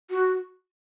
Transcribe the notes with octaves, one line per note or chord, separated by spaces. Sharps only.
F#4